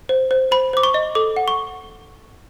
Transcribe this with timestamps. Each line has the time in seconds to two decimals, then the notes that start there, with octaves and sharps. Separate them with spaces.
0.09 C5
0.31 C5
0.51 C5 B5
0.73 C5 D6
0.83 C#6
0.94 D#5
1.15 A4 D6
1.36 F#5
1.48 C#6